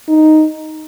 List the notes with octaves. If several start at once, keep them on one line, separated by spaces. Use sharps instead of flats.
D#4